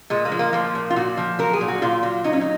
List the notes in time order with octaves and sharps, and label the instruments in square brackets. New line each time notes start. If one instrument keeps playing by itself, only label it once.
[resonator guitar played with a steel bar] A#2 G#3
A#3
F3
A#3
F3 A#3
A#2
F4
A#2 F#4
F3
F#3 A#4
G#4
A#2
F#4
A#2 F4
F#3
F#3 D#4
C#4
D#4